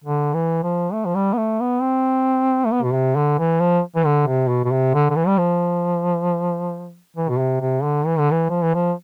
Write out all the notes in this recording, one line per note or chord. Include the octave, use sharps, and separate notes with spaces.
D3
E3
F3
A3
F3
G3
B3
A3
B3
C4
A3
B3
B2
C3
D3
E3
F3
E3
D3
C3
B2
B2
C3
D3
D3
E3
G3
F3
E3
B2
C3
C3
D3
E3
D3
E3
F3
E3
F3